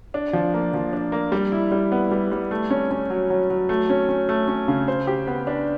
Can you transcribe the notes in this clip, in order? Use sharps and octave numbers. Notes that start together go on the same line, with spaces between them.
D4
F3
A#3
F3
D4
A#3
G3
E4
G3
B3
G3
G3
A3
C#4
C#4
F#3
F#3
F#3
A3
C#4
C#4
A3
C#4
C#3
C5
G4
B3
D4